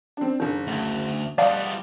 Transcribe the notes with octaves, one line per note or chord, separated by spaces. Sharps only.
C4 D4
F#1 D#3 D4
D2
G3 F4 D5 D#5 F5 F#5 A5